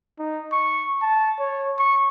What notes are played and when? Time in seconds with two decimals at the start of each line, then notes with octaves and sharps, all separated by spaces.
0.19 D#4
0.52 C#6
1.02 A5
1.39 C#5
1.78 C#6